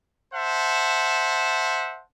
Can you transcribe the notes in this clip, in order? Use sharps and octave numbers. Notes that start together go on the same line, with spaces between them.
C5 E5 F#5 A5